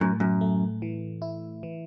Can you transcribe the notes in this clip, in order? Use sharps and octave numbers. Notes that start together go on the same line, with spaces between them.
F#2 A2
F#2
A3
E3
E4
E3